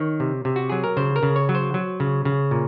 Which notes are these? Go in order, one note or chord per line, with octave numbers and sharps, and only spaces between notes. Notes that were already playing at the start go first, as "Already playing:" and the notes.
Already playing: D#3 C#5
C3
C3
F#4
F#3 G#4
A#4
C#3 C5
A#4
C#3
C#5
F#3
C5
F#3
C#3
C#3
A#2